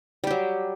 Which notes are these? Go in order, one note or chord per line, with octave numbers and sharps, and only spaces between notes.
F#3 G3 G4